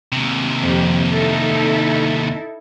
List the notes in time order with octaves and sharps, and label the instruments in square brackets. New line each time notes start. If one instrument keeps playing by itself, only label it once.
[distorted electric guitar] D#2 C3
[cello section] F2 G4
D#4 E4 A4